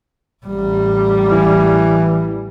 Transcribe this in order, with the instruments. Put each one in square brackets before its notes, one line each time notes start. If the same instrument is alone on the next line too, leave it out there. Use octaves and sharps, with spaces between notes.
[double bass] A1 G3
[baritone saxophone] E3